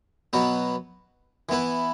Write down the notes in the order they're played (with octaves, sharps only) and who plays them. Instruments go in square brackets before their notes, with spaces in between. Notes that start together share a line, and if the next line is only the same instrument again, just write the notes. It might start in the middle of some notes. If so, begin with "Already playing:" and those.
[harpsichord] B2 F#3 B3 F#4 B4
E3 B3 E4 B4